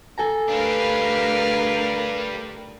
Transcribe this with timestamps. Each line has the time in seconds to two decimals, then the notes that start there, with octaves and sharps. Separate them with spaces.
0.18 A4 G#5 A#5
0.50 D2 G3 D4 A#4 B4 F5